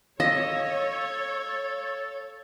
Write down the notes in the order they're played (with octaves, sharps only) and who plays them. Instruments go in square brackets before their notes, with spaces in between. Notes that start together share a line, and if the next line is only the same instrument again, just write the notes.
[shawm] A4 [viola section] C#5 [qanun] D#5 [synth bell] F5